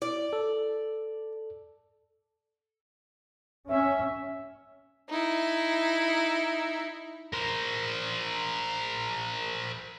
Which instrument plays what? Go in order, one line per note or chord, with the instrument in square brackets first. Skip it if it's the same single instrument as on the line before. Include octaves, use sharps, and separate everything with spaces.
[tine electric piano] E4 [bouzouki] D5
[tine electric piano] A4
[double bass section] C#4 [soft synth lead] E5
[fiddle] D#4 E4
[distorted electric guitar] A#4 C5